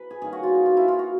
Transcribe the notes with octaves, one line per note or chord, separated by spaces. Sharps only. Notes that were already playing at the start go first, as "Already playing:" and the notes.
Already playing: B4
G#4
D#3 G3 A#3 C#4 G#4
F#4
F4
F#4
F4
E4
F4
F#4